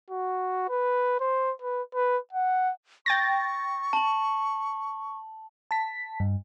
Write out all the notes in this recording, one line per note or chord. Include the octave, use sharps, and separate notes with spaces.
F#4
B4
C5
B4
B4
F#5
G5 C#6 A6 A#6
A5 F#7
A5 B6
G2